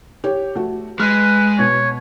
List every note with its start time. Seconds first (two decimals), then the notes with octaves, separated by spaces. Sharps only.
0.24 G4 C#5
0.55 A3 F#4
1.00 G#3 B4 F6
1.59 B2 C#5